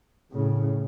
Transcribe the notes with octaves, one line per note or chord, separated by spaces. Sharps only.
A2 C#3